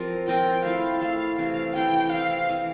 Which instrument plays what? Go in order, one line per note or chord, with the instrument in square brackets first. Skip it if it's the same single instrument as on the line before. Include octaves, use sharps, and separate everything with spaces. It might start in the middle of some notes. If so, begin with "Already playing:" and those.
Already playing: [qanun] F3 C4 F4 G4 A#4
[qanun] F3 C4 F4 A#4 [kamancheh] G5
[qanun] A3 E4 A4 [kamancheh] F5
[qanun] A3 E4 A4 [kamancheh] F5
[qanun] C3 E3 A3 E4 [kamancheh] F5
[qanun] C3 E3 A3 E4 [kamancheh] G5
[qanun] E3 A3 C4 [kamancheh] F5
[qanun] E3 A3 C4